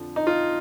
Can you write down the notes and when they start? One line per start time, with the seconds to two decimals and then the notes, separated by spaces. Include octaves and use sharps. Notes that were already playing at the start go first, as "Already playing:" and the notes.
Already playing: F2 D3 F3
0.16 D#4
0.27 F4